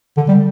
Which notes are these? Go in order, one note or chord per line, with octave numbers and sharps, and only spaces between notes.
D3
G3